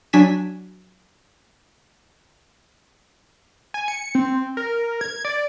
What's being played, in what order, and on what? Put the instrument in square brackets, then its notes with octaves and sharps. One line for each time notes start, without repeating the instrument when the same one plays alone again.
[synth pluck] F#3 D4 G#5 B6 E7
[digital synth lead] G#5
C#7
C4
A#4
G#6
D5